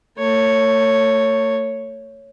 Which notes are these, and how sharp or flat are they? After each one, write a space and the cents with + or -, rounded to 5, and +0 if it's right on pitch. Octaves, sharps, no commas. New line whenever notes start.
A3 +40 C#5 +0